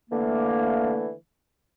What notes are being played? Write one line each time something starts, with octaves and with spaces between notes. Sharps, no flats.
D3 E3 A3 A#3